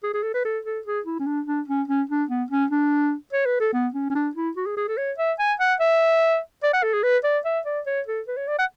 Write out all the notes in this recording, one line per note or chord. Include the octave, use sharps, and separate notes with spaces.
G#4
G#4
A4
B4
A4
A4
G#4
E4
C#4
D4
D4
C#4
C#4
D4
B3
C#4
D4
C#5
B4
A4
B3
C#4
C#4
D4
E4
F#4
G#4
G#4
A4
C#5
E5
G#5
F#5
E5
D5
F#5
A4
G#4
B4
D5
E5
D5
C#5
A4
B4
C#5
D5
F#5